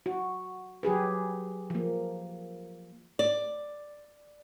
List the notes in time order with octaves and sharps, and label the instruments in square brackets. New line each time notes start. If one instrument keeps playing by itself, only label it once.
[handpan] F#4
F#3 G4 G#4 B4
F3 A#3
[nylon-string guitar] D5